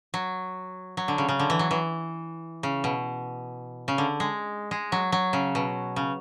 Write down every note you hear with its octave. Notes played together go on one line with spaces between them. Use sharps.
F#3
F#3
D3
C#3
C#3
D3
E3
F#3
E3
C#3
B2
C#3
D3
G#3
G#3
F#3
F#3
C#3
B2
C#3